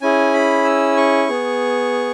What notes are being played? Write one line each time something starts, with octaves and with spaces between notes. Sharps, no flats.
C#4 E4 G#4 G#5
B5
E6
C#6
B3 G#4